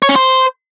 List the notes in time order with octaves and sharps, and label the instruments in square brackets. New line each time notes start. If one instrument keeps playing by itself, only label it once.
[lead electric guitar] C#5
C#4
C5